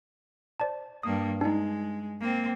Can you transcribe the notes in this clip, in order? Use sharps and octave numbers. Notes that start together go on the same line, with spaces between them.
C5 D5 A5
G2 A#3 D#6
G#3 D4 D#4
A#3 C4